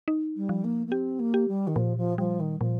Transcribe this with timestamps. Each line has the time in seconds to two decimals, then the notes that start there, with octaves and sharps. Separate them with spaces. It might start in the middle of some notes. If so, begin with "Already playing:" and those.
0.08 D#4
0.36 G3
0.49 F3
0.64 A#3
0.87 A#3
0.92 C4 G4
1.19 A#3
1.34 G4
1.48 G3
1.67 D#3
1.76 A#2 F3
1.97 F3
2.18 F3 G3
2.40 D#3
2.60 A#2 F3